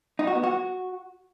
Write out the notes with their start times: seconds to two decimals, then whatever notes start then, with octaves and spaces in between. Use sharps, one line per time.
0.19 D#4
0.27 F#4
0.35 B3
0.44 F#4